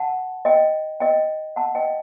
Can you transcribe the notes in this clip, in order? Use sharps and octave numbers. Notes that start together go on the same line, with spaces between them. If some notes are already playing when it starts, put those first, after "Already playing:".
Already playing: F#5 A5
D#5 G5
D#5 G5
F#5 A5
D#5 G5